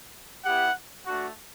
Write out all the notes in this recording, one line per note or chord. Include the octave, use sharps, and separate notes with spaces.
B3 E4 G4 F#5
A3 D4 F#4